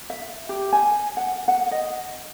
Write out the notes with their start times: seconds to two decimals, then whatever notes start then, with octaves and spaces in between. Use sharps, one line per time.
0.10 E5
0.49 G4
0.73 G#5
1.17 F#5
1.48 F#5
1.71 D#5